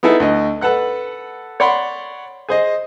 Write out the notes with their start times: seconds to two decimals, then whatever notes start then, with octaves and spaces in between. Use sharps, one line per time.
0.03 B3 D#4 E4 G#4 A4
0.20 D2 D#5
0.61 A4 B4 F#5 F#6
1.60 C#5 D5 F#5 B5 C6
2.49 G#4 C5 D#5